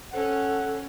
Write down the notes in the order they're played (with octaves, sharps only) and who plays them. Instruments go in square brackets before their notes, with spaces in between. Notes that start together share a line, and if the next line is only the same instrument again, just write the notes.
[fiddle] C#4 [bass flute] A4 [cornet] F#5